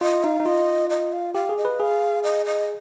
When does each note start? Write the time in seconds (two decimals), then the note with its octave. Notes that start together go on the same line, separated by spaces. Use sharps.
0.01 F4 D#5
0.24 D#4 F5
0.40 D#4
0.45 F4 D#5
0.90 D#5
1.13 F5
1.34 G4 F5
1.49 G#4
1.57 D#5
1.65 B4
1.80 G#4 F5
2.24 D#5
2.46 D#5